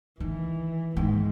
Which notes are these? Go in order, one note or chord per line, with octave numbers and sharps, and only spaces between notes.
D#3 E3
G#2 D#3